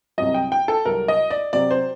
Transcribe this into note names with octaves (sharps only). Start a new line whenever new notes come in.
C2 C3 F#3 D#5
G5
G5
A4
C2 C3 F#3 A#4
D#5
D5
C3 F#3 C4 D5
C5